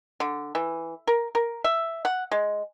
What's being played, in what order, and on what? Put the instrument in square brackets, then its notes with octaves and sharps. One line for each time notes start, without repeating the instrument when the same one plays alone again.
[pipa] D3
E3
A#4
A#4
E5
F#5
G#3